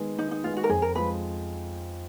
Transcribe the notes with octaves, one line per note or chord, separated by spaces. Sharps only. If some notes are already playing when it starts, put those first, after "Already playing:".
Already playing: D#3 G#3 B3
D#3 D#4
D#4
G#3 B3 F4
F#4
A#4
F2 G#4
A#4
F3 G#3 B4